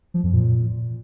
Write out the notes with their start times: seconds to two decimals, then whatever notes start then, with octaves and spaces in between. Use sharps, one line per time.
0.14 F3
0.23 F2
0.33 A#2